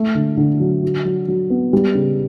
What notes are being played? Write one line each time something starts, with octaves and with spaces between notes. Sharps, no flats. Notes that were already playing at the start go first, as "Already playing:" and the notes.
Already playing: A3
D3
D3
F#3
F#4
F#3
F#3
B3
G3
C#3